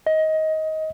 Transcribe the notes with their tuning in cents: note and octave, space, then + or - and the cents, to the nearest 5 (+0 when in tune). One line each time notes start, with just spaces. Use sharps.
D#5 +20